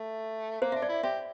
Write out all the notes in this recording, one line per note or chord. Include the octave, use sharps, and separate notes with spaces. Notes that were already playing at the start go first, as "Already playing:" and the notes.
Already playing: A3
A#3 C5
D4 E5
D5
E4
G4 E5